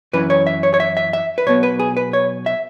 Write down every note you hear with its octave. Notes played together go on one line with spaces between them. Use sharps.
F#2 E3 C#4 B4
C#5
E5
C#5
C#5
E5
E5
E5
B4
B1 B2 B3 C#5
B4
G#4
B4
C#5
E5